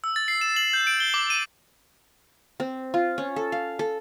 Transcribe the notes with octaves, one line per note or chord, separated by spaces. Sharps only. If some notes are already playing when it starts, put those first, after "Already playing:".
E6
A6
C7
E7
F#7
G6
D7
G7
D6
D#7
C4
F4
C#4
A4
F5
A4